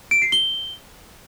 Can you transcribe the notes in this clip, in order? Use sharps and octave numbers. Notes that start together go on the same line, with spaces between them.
D7
C7
G7